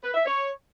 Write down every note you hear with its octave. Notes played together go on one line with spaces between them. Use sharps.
B4
E5
C#5